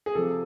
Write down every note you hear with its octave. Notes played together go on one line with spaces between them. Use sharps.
G#4
C3 F3 A4